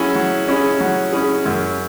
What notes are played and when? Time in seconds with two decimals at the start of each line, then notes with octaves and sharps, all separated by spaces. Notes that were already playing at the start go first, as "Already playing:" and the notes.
Already playing: F#3 C#4 E4 G#4
0.15 F#3
0.48 C#4 E4 G#4
0.80 F#3
1.12 C#4 E4 G#4
1.45 F#2